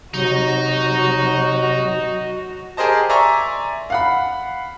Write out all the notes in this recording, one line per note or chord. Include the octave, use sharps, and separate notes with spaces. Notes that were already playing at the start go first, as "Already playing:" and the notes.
C3 F#3 D#4 F#4
G4 G#4 A#4 C5 D#5 A5
D5 E5 G#5 A#5 C6 C#6
F5 F#5 B5